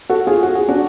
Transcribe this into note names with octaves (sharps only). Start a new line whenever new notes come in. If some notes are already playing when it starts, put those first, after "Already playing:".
F#4 A4
F4 G#4
F#4
G#4
D4 F#4